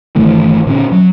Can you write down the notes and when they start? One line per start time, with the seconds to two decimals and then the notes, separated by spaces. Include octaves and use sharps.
0.16 G1 D#3 E3 A3
0.67 A#2 D3 C#4
0.92 F#3